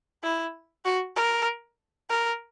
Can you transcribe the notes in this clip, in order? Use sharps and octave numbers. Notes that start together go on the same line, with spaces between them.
E4
F#4
A#4
A#4